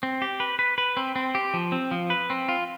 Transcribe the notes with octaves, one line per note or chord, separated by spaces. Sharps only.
C4
G4
B4
B4
B4
C4
C4
G4
F3
C4
F3
B4
C4
F4